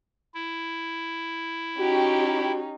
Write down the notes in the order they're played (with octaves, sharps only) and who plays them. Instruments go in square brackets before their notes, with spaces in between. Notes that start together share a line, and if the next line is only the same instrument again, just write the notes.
[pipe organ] E4
[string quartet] C#4 D#4 [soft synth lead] F#4 [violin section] G4